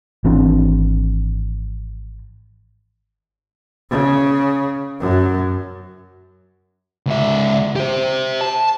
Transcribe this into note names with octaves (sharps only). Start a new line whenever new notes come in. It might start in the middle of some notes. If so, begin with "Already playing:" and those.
G#1 E3 C4 D4
C#3
F#2
C#2 E5
G4 C5
A5